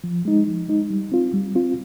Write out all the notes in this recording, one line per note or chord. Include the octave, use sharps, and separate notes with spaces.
F3
G#3 D#4
F3
G#3 D#4
G3
C4 F4
G3
C4 F4